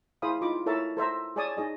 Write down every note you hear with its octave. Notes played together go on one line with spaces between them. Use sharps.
E4 G#4 C5 F5 B5 D#6
D#4 F4 B5 D6
E4 A4 A#4 C#5 E5 A5
A4 C5 E5 A#5
G#4 C#5 D5 G#5 A5 D#6
D#4 G#4 D#5